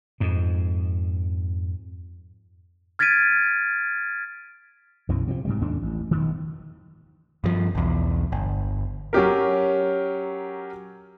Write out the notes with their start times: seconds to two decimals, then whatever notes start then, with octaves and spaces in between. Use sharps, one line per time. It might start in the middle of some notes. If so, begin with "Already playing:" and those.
0.20 F2 G#2
2.99 F6 G#6 A6 B6 D7 D#7
5.09 B1 F#2 B2 E3
5.28 C3 E3 F3
5.45 G#2 C3 G3
5.61 D#2 G#2 A3 D4
5.82 A1
6.11 E1 G2 D#3
7.44 G2 F3
7.75 B1 E2
8.32 G1
9.13 F#3 C#4 G4 A#4